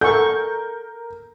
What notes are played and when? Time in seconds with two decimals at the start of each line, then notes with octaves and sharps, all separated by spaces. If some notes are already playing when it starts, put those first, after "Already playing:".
0.01 A4 A#4 D5 F#5 G#5 C#6 G6